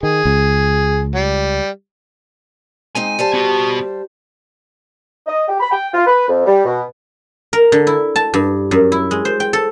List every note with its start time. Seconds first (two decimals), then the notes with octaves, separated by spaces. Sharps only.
0.03 D#3 G#4
0.25 C#2
1.15 G3
2.95 G#3 C4 D#4 G#5
3.19 G3 G4 C5 A5
3.34 B3 F#4
5.27 D#5
5.48 G4
5.60 B5
5.72 G5
5.94 F4
6.06 B4
6.28 F2
6.46 G3
6.65 B2
7.53 A#4
7.72 D3
7.87 E4
8.16 A5
8.34 G2
8.71 F#2
8.92 E4
9.11 G#3
9.25 C5
9.40 G5
9.53 A4